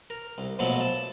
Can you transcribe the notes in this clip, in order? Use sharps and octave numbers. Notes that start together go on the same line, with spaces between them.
A#4
C2
A#1 B2 F3 F#3 A3
A5